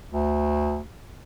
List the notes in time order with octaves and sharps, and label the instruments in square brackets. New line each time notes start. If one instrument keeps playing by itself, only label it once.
[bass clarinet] D2